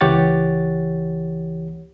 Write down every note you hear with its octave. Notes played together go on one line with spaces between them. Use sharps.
C#2 E3 G4 C#5 F#5 A6